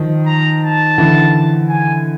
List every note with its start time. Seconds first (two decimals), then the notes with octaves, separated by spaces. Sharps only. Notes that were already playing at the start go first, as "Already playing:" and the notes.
Already playing: D#3 F3
0.26 A#5
0.62 A5
0.98 D3 E3
1.69 G#5